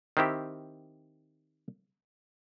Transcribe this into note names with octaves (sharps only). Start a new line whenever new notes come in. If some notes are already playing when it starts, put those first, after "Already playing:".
D#3 C4 E4 G4